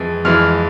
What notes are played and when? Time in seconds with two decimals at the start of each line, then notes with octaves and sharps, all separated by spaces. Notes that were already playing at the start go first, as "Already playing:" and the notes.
Already playing: F2 E3 G#3
0.25 F2 E3 G#3 F6